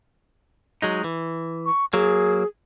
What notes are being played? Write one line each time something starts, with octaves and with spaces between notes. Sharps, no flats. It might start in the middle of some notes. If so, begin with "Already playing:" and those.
F#3 G#3 D#4
E3
C#6
F#3 A#3 G#4